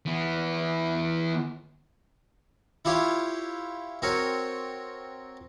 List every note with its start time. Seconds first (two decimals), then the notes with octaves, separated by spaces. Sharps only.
0.06 E3 B3
2.85 E4 F4 G4 C#5 F5
4.02 C4 F#4 A#4 C#5